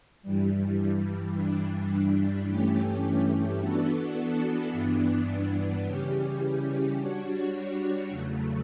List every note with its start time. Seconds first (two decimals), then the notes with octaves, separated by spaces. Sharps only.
0.22 G2 E3 G3
1.35 G2 E3 G3 D4
2.47 G2 E3 A3 C#4 G4
3.60 E3 B3 D4 F#4 A4
4.72 G2 E3 B3 D4
5.85 C#3 E3 G3 C#4 G4
6.97 G3 D4 F#4 C#5
8.09 E2 C#3 F#3 A3